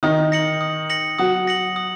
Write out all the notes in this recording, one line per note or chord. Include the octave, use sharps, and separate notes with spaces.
D#3 D#4 D#6
A#6 C#7 F#7
D#6
A#6 C#7 F#7
F#3 F#4 D#6
A#6 C#7 F#7
D#6